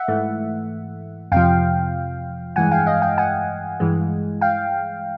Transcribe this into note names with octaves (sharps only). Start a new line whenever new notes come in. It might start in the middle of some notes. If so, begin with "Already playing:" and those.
Already playing: E5 F#5
G#2 E3 A3
F2 C3 F3 F5 G5
G2 E3 G#3 F#5 G#5
F5 G5
D#5 F5
F5 G5
F#5 G#5
G2 E3 G#3
F5 G5